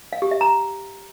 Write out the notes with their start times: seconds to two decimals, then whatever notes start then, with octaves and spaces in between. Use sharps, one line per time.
0.13 F5
0.22 G4
0.31 E5
0.41 A#5